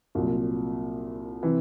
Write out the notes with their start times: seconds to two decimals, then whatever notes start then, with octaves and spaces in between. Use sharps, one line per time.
0.15 C2 A#2 F#3
1.43 C3 E3